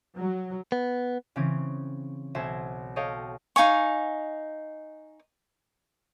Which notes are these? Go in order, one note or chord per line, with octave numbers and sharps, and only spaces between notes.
F#3
B3
C#3 E3 C4 C#4
B1 F#4 C5 E5 G#5 E7
A4 C#5 D#5 F5 G5
D#4 F5 G#5 C#6